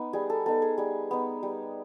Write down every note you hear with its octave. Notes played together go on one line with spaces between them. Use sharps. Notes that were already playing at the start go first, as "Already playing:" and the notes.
Already playing: B3 D#4
G3 G#4
A4
B3 D#4 A4
G#4
G3 G#4
B3 D#4
G3